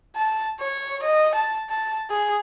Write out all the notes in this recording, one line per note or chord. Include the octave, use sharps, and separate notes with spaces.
A5
C#5
D#5
A5
A5
G#4